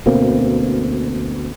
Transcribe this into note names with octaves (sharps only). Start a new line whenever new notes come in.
D2 B2 A#3 C4